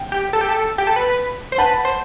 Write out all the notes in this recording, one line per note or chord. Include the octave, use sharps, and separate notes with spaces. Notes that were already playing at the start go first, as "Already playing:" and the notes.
Already playing: G5
G4
A4
G4
A4
G4
A4
B4
C5
B4 F#5 A5
C5